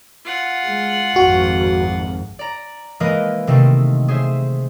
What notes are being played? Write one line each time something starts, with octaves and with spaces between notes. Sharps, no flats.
F4 F#5
G#3
G#1 F2 F#4
D5 A#5
E3 G#3 A#3 A#4 B4 D#5
C3 D#3 A3 C4
G#4 C5 E5